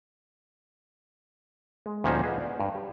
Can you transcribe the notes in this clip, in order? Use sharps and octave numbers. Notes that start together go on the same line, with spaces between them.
G#3
D2 A#2 F3 C#4 D#4 C5
G#4 B4 D#5 F5 F#5
D5
G2
G4